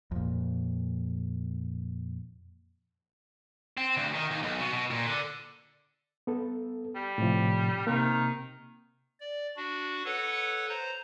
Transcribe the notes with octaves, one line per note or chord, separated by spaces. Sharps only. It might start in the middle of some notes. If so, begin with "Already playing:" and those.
F2 A#2
C4
D2
D#3
D#2
B1
B2
B2
A#2
D3
B3 A4
G3
A2 C3 F3
C3 D#3 A#3
D5
D4 F#4
A4 B4 C#5 F#5
C5 A#5